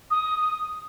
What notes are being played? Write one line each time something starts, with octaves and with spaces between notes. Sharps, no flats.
D#6